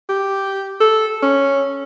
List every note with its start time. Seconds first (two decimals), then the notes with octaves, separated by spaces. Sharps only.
0.09 G4
0.80 A4
1.22 C#4